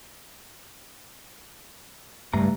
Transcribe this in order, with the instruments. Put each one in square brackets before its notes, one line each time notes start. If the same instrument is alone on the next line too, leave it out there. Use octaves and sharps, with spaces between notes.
[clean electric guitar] C#2 A3 A#5 [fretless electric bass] G2